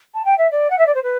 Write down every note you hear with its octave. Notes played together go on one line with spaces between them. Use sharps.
A5
G5
E5
D5
F#5
E5
D5
C5
B4